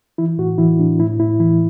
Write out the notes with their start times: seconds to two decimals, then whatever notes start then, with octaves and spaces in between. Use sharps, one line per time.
0.18 E3 E4
0.38 A2 F#4
0.58 E3 E4
0.79 A2 D4
1.00 A2 E4
1.19 A2 E4
1.40 E3 E4